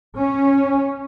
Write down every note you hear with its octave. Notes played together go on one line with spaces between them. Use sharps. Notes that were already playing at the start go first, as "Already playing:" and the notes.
C#4